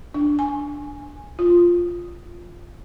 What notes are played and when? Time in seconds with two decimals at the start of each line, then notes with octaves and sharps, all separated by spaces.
0.14 D4
0.39 G#5
1.39 F4